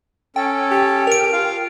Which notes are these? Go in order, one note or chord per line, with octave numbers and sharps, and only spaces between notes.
C#4 A4 G5
G4
A#4 D7 F7
F4 F5